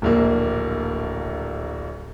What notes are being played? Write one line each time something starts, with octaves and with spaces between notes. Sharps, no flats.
D1 A#1 A#3